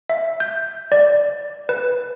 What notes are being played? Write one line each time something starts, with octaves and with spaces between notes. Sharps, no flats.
E5
G6
D5
B4